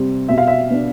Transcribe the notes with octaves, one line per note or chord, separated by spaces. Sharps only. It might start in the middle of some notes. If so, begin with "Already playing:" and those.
Already playing: C3 G3 C4
B2 E5
F5
E5
B3 D4